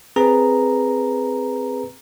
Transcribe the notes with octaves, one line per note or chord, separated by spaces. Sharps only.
C4 G#4 B4 A#5